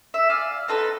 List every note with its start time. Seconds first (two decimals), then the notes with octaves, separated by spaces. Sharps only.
0.14 E5
0.30 D5 F5 G#5
0.68 C4 D#4 A4 B4